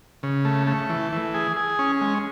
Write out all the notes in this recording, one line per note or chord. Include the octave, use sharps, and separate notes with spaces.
C#3
A3
A3
E3
E3
G#4
G#4
C#4
G#3